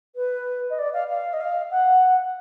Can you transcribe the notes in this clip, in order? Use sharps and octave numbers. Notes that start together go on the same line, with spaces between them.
B4
D#5
D5
F5
F5
D#5
F5
F#5